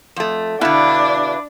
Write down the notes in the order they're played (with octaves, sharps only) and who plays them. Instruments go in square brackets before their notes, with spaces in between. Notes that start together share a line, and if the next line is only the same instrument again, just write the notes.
[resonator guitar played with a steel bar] F2 A3
[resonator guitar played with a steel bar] B2 D3 [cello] D4 [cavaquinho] E4 B4 F5